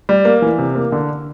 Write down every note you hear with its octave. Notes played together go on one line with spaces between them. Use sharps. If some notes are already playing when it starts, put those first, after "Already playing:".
G3
A#3
E3
C3
A#3
D3